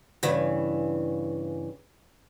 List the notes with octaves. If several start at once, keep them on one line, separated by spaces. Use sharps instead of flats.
G2 C#3 E3